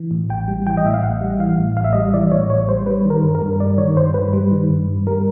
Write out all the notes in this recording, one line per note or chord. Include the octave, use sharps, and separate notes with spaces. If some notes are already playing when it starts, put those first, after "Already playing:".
Already playing: E3
A2
A1 G5
G3
E3 G5
D#5
A2 E5
F5
A1 F#5
G3
E3 F5
A2
A1 F5
E5
G3 D#5
E5
E3 D5
A2 C#5
A1 C#5
G3 C5
G3 B4
D#3 A#4
G2
A#4
G2
G3 D5
D#3 C#5
G2 C5
G2 B4
G3
D#3
G2
G2
G3 A#4